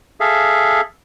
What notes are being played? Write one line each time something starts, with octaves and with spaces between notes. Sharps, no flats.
G#4 A4 E5 F5